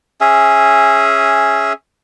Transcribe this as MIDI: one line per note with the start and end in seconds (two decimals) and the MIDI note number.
0.21 1.73 61
0.21 1.73 68
0.21 1.73 76